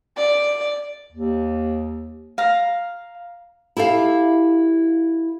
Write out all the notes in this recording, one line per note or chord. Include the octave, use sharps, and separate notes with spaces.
D5
D#2
F5 A#5
E4 G4 A4 F5